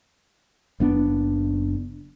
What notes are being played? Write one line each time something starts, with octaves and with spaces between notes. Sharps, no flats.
F#1 B3 D4